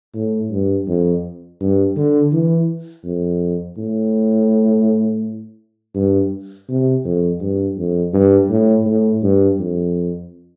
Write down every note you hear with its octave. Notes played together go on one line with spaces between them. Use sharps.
A2
G2
F2
G2
D3
E3
F2
A2
G2
C3
F2
G2
F2
G2
A2
A2
G2
F2